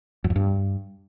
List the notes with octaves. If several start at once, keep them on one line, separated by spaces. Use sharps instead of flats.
F#2
F2
G2